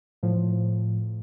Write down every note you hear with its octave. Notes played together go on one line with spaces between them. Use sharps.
A2 F3